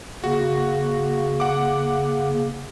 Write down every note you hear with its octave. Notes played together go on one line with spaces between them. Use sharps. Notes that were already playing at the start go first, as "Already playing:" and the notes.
C#3 A#3 F#4
F#5 D6